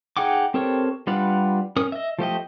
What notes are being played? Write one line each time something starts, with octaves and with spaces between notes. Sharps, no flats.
D#4 G#4 F#5 G5 D6
C4 G4 A4 A#4 C#5
G3 D4 F4 B4 F#5
C#4 A#4 D#6
D#5 E5
F3 A3 G4 D#5